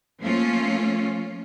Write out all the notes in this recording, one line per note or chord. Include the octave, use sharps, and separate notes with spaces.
F3 A3 A#3 C#4 F4